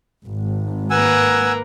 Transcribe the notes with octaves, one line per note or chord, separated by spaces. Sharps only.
G#1
A#3 A#4 B4 F#5 G#5 E6